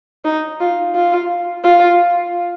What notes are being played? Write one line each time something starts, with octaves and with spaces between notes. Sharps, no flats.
D#4
F4
F4
F4